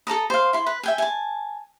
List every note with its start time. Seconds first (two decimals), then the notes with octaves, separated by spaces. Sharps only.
0.07 A4 A5 A#5 D#6
0.30 C5 F5
0.53 E4 C6
0.66 B4
0.83 E5 G5 G#5
0.98 G#5 A5